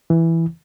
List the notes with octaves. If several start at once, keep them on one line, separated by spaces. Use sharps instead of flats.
E3